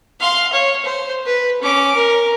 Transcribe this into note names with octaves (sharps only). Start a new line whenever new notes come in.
F5 C6
C#5
C5
B4
C#4 D6
A#4